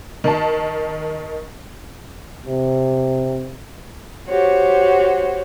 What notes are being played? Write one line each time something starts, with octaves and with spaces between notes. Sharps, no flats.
D#3 A5
C3
F#4 G4 C5 C#5